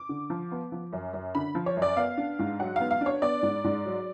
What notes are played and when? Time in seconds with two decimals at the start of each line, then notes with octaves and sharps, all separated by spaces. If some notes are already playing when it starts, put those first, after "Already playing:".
Already playing: D6
0.09 D3
0.30 F3
0.52 B3
0.72 F3
0.93 F#2
1.13 F#2
1.35 D3 B5
1.55 F3
1.66 C#5
1.77 F#2
1.82 D5
1.97 B3 F5
2.17 D4
2.39 G#2
2.60 F#3 F#5
2.76 B3 F5
2.91 F5
3.01 D4
3.06 C#5
3.22 B3 D5
3.43 G#2
3.64 G#2
3.86 F#3